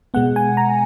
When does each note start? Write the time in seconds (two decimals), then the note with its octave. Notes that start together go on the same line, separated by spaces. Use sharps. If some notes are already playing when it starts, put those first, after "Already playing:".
0.14 B2 G#3 B3 F#5
0.36 G#5
0.57 A#5